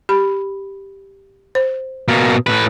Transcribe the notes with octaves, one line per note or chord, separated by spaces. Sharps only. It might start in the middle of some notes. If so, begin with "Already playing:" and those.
G4 B5
C5
B2 A#3
A2 B4